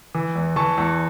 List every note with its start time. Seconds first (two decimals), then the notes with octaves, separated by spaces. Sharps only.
0.15 E3
0.36 E2
0.56 E3 A5 C#6
0.78 E2